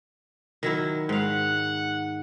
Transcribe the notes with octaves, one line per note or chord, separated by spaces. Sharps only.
D#3 F#3 E4
G#2 F5 F#5